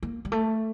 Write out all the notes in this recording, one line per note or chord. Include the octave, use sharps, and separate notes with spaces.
A#3
G3
A3